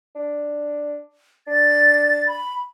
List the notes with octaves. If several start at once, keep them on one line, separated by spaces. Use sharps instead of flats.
D4
D4 A6
B5